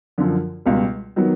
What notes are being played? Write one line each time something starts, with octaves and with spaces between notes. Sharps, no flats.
F#2 D3 F3
C#2 B2 G3
D#3 F#3 B3